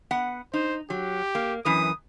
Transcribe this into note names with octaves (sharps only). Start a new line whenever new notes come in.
B3 F#5
D#4 C5
F#3 G4
A#3
F#2 E3 B4 D#6